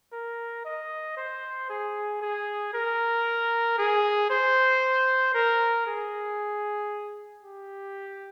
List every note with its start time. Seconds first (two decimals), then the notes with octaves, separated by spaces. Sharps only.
0.13 A#4
0.65 D#5
1.17 C5
1.69 G#4
2.22 G#4
2.74 A#4
3.78 G#4
4.30 C5
5.35 A#4
5.86 G#4
7.43 G4